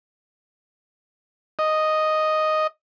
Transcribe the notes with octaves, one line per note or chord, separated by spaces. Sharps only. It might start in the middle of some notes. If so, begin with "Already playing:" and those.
D#5